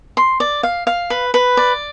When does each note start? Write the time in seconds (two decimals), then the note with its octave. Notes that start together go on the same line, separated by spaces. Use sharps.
0.17 C6
0.40 D5
0.63 F5
0.87 F5
1.10 B4
1.34 B4
1.57 D5